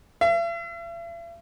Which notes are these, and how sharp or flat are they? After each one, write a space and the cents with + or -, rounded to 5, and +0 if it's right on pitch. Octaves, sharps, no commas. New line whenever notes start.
E5 +45